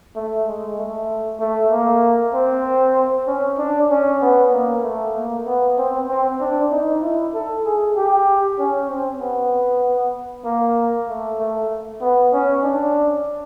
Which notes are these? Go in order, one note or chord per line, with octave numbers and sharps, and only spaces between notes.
A3
G#3
A3
A3
A#3
C4
C#4
D4
C#4
B3
A#3
A3
A#3
B3
C4
C4
D4
D#4
E4
A4
G#4
G4
C#4
C4
B3
A#3
A3
A3
B3
C#4
D4